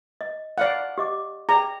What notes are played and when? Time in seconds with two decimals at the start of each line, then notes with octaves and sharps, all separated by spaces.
0.21 D#5
0.58 D5 F5 F#5 B5
0.98 G4 D#5 D6
1.49 G#4 D5 G5 A#5